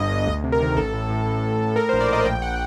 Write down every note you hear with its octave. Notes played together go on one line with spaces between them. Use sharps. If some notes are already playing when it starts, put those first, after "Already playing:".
Already playing: G1 G2 D#5
G1
D2
C3
A#4
D#3
A1 A4
A2
A2
A1
A2
A2
A2 A#4
A#1 C5
D5
A2 D#5
A#1 G5
F#5